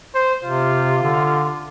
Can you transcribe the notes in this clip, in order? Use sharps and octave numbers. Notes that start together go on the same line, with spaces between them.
C5
C3 F4
D3